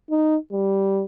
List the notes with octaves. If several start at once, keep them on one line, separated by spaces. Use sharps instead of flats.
D#4
G3